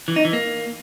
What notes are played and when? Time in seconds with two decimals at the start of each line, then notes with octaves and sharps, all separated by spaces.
0.08 E3
0.16 D#4
0.25 E3
0.33 A#3